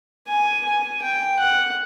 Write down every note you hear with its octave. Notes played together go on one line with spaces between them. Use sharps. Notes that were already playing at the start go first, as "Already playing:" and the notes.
G#5
G#5
G5
F#5